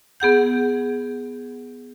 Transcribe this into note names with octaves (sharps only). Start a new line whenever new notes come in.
B3 G#4 F#5 G6